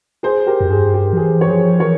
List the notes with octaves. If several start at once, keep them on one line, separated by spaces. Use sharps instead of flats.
G#4 C5
G4 A#4
F2
G2 G#4
G4
F3
E3 G#4
C#5
F3 G#4 C5
E3 A#4 C#5